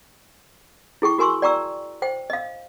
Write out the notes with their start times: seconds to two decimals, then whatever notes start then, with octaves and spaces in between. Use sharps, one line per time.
1.02 E4 G#4 G5 C#6
1.18 F#4 A#4 G#5 C6 C#6 E6
1.42 D5 G5 A#5 C#6 E6
2.02 C5 G5
2.30 D#5 F5